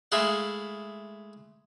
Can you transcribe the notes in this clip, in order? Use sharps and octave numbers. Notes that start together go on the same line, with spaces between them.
G#3 A3 E4 G#4 F5 F#5